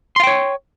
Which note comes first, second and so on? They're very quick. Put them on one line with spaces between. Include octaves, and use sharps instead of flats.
C6 F5 G5 C#5